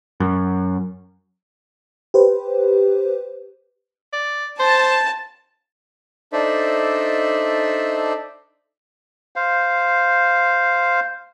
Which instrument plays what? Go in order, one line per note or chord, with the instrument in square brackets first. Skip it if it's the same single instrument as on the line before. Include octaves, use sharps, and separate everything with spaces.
[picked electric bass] F#2
[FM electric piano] G4 B4 C5
[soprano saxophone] D5
[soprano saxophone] C5 [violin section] A5
[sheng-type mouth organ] D4 D#4 A4 C5 D5 E5
[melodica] C5 F5